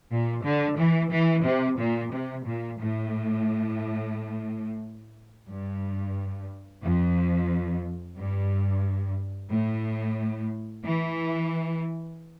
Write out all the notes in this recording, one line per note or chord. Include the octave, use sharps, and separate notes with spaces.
A#2
D3
E3
E3
C3
A#2
C3
A#2
A2
G2
F2
G2
A2
E3